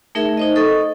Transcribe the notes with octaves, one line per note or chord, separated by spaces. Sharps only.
A3 D#4 G#4 A#4 E5
D#4 C5 D#5
A4 D#5 C#6 D#6